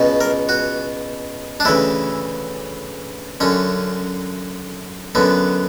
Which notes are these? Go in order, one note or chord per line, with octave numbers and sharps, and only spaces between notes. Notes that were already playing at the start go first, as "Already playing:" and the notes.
Already playing: C#2 B2
A#4
F#4
D4
D2 C#3 E3 E4
F#2 D3 C#4
F#2 D3 B3